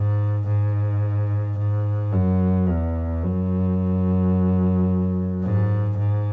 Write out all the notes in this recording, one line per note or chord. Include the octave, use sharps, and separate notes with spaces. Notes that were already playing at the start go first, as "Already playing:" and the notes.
Already playing: G#2
G#2
G#2
F#2
E2
F#2
G#2
G#2